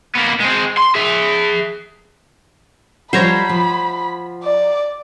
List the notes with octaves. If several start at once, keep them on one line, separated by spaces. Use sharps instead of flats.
A#3 B3
G#3 C4
C6
G#4 E5
F3 G3 C5 C#5 F#5 A#5 B5
F3
D5